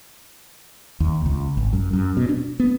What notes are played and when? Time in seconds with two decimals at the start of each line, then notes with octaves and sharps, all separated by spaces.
1.00 D#2
1.26 C#2
1.57 G#1
1.73 F#2
1.93 F#2
2.17 B2
2.29 D4
2.60 B3